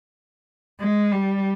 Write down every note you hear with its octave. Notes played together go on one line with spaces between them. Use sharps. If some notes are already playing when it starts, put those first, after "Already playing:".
G#3
G3